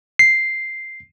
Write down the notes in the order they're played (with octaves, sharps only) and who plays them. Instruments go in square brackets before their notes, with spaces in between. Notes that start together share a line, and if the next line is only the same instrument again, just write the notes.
[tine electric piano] C7